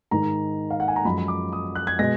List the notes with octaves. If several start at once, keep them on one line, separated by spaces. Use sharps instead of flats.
G#2 D#3 G#3 A#5
F5
F#5
G#5
A#5
F#2 F3 G#3 B5
B5
D6
D#6
F#6
G#6
B2 G#3 A#6